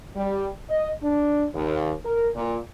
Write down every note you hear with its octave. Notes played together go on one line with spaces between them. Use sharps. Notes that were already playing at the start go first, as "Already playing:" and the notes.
G3
D#5
D4
D#2
A#4
A#2